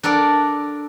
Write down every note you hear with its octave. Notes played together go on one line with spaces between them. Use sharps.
D4 A4 A#4 D5